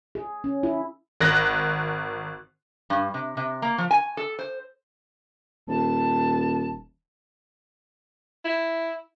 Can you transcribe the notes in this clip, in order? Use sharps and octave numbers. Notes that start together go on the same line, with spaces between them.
G#4
C#4
E4
G#1 F#6 A#6
G2
C3
C3
A#3
F3
G#5
A4
C5
D#1 A5
E4